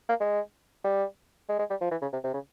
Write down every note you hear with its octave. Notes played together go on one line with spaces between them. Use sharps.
A#3
G#3
G3
G#3
G#3
G3
F3
E3
C#3
C3
C3
C#3